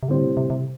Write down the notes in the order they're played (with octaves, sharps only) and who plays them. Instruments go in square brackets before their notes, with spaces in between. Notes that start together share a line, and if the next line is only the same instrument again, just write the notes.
[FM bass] C3
[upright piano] A2 G3 C4 G4 [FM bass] D3
[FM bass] C3
C3
C3